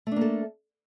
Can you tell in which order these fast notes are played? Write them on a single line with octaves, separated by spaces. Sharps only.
A3 D4 A#3 A4